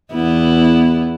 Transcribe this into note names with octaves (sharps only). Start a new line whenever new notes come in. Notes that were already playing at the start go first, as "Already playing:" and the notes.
E2 B3 E4